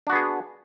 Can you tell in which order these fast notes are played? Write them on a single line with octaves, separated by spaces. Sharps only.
D4 F#4 B3 G#4